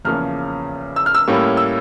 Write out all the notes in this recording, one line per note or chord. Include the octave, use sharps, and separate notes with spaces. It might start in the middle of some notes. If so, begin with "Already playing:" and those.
E2 C#3 F3 A#3 C#4 F6
E6
F6
E6
A2 G3 A#3 C#4
E6